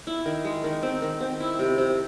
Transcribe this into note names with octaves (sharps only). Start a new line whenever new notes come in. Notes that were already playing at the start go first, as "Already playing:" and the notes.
E4
D#3
G#3
D#3
C4
D#3
C4
E4
C3
C3